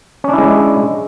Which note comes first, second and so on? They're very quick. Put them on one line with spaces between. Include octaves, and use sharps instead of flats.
C#4 D4 E4 G#3